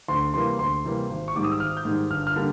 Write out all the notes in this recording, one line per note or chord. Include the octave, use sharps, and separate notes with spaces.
D2 C6
C3 E3 G3 A#3 C6
D2 C6
C3 E3 G3 A#3
G#1
C#6
G#2 D#3 G3 D6
D#6
E6
G#1 F6
G6
G#2 D#3 G3
G1 F6
F6
D3 G3 A#3